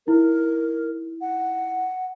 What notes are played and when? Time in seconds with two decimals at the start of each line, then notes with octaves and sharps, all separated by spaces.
0.07 D#4 E4 A#4
1.21 F#5